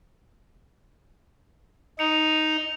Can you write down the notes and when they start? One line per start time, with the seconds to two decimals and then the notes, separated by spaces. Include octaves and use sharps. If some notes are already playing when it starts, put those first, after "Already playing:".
1.99 D#4 C#7 F7